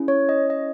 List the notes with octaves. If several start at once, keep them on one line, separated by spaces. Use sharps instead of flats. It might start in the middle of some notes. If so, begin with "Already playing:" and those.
Already playing: C#4 E4 G#4
C#5
D#5
D#5